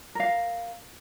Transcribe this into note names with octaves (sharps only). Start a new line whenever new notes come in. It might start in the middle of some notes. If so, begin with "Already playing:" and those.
A#4 F5